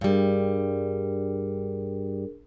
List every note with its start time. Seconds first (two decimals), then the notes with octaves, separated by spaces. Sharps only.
0.01 G2 G3 D4 G#4 A#4